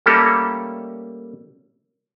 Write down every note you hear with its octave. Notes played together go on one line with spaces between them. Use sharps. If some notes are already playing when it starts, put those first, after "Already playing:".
G3 A3 A#3 C#4 G4 A4